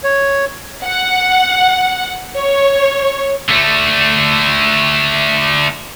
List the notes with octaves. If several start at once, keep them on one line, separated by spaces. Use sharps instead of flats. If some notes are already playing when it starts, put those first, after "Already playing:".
C#5
F#5
C#5
D3 A3